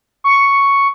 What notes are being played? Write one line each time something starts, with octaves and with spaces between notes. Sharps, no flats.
C#6